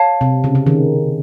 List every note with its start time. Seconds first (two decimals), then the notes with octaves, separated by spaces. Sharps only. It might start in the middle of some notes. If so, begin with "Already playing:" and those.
Already playing: C#5 F5 A5
0.21 C3
0.44 C#3
0.55 C#3
0.67 D#3